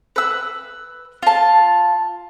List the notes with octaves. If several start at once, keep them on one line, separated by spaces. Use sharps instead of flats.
B4 E6
F4 A5